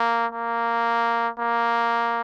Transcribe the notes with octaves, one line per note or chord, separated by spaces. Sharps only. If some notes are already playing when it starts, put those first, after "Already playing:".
Already playing: A#3
A#3
A#3